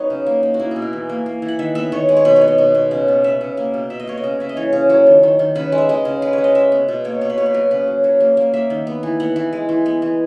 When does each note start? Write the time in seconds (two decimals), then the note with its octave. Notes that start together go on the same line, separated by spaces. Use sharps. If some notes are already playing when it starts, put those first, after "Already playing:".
Already playing: F#3 B3 D#4 B4 C#5
0.10 C#3
0.27 A#3
0.43 A#3
0.54 F#4
0.60 A#3 E4
0.71 B2 G#4
0.82 A#4
0.93 E3
1.09 A#3
1.26 A#3
1.42 E3
1.48 F#5
1.59 D#3 E5
1.75 B3 E5
1.92 D#3 C#5
2.09 G#3
2.17 C#5
2.25 B2 B4
2.36 C#5
2.42 B3
2.48 D#5
2.58 B2
2.75 B2
2.91 C#3
3.08 B3
3.24 B3 E5
3.41 C#3
3.57 A#3
3.74 B2
3.90 B2 E5
4.00 D#5
4.07 A#3 C#5
4.18 D#5
4.24 C#3
4.40 C#3 E5
4.49 D#5
4.57 E3 C#5
4.73 C#3
4.90 F#3 C#5
5.06 D#3
5.23 D#3
5.39 D#3
5.55 C#3 B4
5.72 G#3
5.78 E5
5.89 G#3 D#5
6.05 C#3
6.22 G#3 B4
6.33 C#5
6.38 G#3
6.44 D#5
6.55 G#3 E5
6.72 B3
6.89 B2
7.05 A#3 C#5
7.21 B2 C#5
7.30 B4
7.38 A#3 C#5
7.46 B4
7.54 F#3 A#4
7.71 C#3 B4
7.88 F#3
8.04 F#3
8.20 A#3
8.37 A#3
8.54 A#3 E5
8.70 D#3
8.87 B3
9.03 E3
9.20 B3 F#5
9.36 E3
9.53 G#3
9.69 E3
9.86 B3
10.02 E3